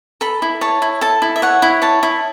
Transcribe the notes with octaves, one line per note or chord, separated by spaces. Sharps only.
A4 B5
E4
C#5 A5
E4
A4 A5
E4
E5
C#5 F#5
E4
C#5 A5
E4